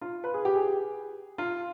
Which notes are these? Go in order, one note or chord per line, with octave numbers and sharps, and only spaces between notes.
F4
B4
G#4
G4
G#4
F4